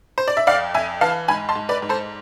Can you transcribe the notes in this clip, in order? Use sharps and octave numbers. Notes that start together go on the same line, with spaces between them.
C5
D5
E5
F2 D5 F5
F2 E5 G#5
E3 F5 A5
G#2 G#5 B5
A5 C6
G#2
B4 D5
G#2
A4 C5